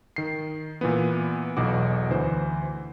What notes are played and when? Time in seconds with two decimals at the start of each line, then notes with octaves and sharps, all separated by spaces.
0.16 D#3 C7
0.81 A#2 E3 B3
1.57 B1 E2 B2 F#4 D6
2.10 D2 E3 C5